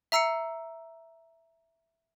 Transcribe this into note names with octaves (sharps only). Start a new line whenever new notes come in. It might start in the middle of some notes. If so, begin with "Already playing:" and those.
E5 A#5 E6 C7 C#7